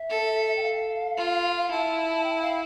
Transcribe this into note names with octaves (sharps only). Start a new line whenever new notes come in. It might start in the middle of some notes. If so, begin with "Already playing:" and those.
Already playing: E5
A4
G5
F5
F4
E4 A5
G5
F5